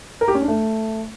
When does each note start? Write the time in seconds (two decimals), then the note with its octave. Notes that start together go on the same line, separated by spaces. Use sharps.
0.21 A#4
0.28 G4
0.35 C#4
0.41 D4
0.48 A3